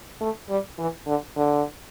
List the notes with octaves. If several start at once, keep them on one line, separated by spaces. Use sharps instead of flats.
A3
G3
E3
D3
D3